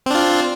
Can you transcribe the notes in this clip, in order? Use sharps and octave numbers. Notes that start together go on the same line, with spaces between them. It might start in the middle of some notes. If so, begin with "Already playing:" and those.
C4 D4 F4